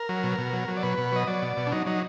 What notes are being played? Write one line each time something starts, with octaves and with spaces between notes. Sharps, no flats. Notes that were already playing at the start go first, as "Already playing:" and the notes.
Already playing: A#4
F#3
B2
B2
F#3
F#3
D5
B2 B4
B2
F#3 D#5
F#3 D5
B2
B2
D4
F#3 D#4
F#3 D#4